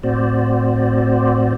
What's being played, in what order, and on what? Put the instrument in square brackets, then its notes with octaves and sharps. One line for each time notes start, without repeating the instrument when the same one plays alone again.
[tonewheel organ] A2 C4 F#4 C5 D5